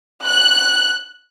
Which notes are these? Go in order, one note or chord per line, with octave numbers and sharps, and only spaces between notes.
F#6